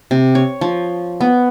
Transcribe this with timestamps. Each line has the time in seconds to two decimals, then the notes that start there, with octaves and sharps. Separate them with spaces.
0.11 C3
0.35 C#5
0.61 F3
1.21 B3